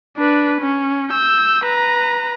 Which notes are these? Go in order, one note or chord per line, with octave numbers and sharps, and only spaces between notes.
D4 B4
C#4
E6 G6
B4 A#5